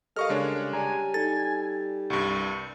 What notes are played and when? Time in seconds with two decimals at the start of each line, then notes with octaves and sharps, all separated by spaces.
0.16 G3 A4 A#4 D#5 F5 C#6 F6
0.30 C#3 G#3 D4 C#5
0.73 G4 D5 G#5 A#5
1.14 D#4 A4 A6
2.10 C2 G2 C#6